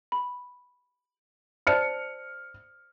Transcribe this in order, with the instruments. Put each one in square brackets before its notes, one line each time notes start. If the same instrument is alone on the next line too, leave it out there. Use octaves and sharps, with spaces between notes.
[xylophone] B5
[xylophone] C5 D5 A5 [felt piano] F6 C#7